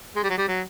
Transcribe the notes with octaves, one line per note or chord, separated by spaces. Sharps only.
G#3
G3
F#3
G3
F#3